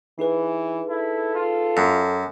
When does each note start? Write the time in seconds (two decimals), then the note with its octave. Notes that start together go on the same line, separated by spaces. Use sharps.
0.19 E3 D#4 G#4 B4
0.89 E4 A4
1.35 F4
1.77 F#2